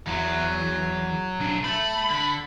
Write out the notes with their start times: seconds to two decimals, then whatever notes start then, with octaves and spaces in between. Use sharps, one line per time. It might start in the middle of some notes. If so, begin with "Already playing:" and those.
0.07 E2 F#3
1.40 B1 D4
1.64 A3 B5
2.10 D3